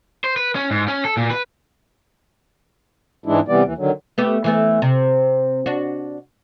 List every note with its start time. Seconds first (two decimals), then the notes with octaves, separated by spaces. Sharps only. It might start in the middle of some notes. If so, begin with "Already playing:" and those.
0.24 C5
0.36 B4
0.55 C#4
0.71 G#2
0.88 C#4
1.05 A4
1.17 A#2
1.30 B4
3.26 G#2 E3 G#3 D4 E4
3.48 C3 E3 G3 B3 D5
3.63 D#2 E3
3.77 D3 D#3 F#3
4.18 A3 B3 G4
4.44 E3 A3 B3
4.82 C3
5.66 D4 F#4